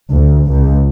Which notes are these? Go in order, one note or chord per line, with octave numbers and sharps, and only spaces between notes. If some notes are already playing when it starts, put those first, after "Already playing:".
D2
C#2